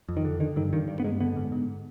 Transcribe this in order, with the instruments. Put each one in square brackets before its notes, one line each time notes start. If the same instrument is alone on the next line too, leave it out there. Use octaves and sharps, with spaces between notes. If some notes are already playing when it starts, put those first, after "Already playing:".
[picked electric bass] F2
D#3
D3
D3 D#3
G2 D#3
G2 D#3
G2
B3
G2 G#3
D3 B3
G#2
G#2